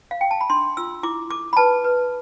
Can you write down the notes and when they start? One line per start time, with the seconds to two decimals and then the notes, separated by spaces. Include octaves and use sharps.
0.11 F5
0.21 G5
0.31 A5
0.41 B5
0.50 D4 C6
0.77 F4 E6
1.03 E4 D6
1.30 A4 D6
1.53 B5
1.57 B4 A5
1.84 B4